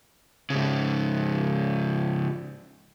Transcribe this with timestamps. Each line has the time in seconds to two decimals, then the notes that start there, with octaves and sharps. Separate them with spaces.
0.50 G#2 C#3